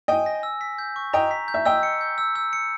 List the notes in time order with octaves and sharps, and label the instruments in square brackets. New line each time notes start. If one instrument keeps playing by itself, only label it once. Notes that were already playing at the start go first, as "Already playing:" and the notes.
[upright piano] D#5 G5 [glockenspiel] G#5
[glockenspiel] A#6
E6
B6
G6
C#6
[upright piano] D#5 G5 [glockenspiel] A#5
[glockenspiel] B6
G6
[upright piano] E5
[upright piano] D#5 G5 [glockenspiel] E6
[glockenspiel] C#7
G6
E6
E6
C#7